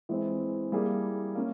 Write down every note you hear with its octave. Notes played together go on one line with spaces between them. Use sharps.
E3 G#3 C4
G3 A#3 E4 G#4
A#3 C#4